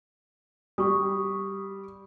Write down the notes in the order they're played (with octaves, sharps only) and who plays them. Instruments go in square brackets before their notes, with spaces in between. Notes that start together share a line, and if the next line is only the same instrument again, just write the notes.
[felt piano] G3 [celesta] C#6 D#6